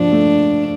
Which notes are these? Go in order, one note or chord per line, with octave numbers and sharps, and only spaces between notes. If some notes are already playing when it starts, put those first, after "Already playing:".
Already playing: F3 D4
A3